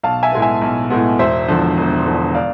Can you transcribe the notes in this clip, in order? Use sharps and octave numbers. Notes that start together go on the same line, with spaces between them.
B1 F5 A5
E5 G#5
A2 G#3 B3
E5 G#5
B1
A2 G#3 B3
E1 C5 E5
E2 D3 F3
E1
E2 D3 F3
D5 F5